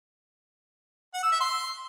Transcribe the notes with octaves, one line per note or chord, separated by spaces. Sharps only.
F#5
E6
E5
C6